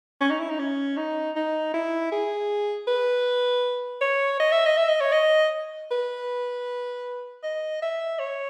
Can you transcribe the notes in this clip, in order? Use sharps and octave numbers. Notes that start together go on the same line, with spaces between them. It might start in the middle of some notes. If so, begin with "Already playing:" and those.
C#4
D#4
E4
D#4
C#4
D#4
D#4
E4
G#4
B4
C#5
D#5
E5
D#5
E5
D#5
C#5
D#5
B4
D#5
E5
C#5